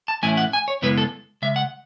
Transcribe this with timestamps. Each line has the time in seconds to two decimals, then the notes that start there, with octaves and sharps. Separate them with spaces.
0.08 A5
0.23 A2 E3 A3 C#4 E4 G#5
0.37 F#5
0.53 G#5
0.68 C#5
0.82 F#2 C#3 G#3 B3 E4 B4
0.98 A4
1.42 C#3 G#3 E5
1.56 F#5